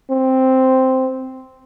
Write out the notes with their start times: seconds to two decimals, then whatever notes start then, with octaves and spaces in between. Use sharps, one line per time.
0.11 C4